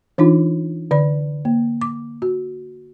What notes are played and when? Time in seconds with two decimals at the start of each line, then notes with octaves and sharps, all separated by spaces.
0.18 E3 D4 D#4 F4
0.91 D3 D5 B5
1.45 A#3
1.82 D6
2.22 F#4